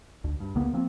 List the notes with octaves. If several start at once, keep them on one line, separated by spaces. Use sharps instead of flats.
D2
G2
C#2 C#3 A#3 B3
F3 A#3 C4